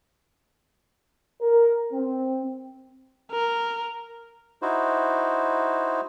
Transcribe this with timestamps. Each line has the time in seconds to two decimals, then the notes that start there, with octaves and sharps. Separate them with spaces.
1.41 A#4
1.93 C4
3.32 A#4
4.62 D#4 E4 F#4 C5